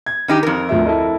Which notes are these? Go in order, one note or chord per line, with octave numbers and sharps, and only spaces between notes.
G#6
D#3 D#4 G4
F2 A#4
D2 F3 E5
E4 A4 D#5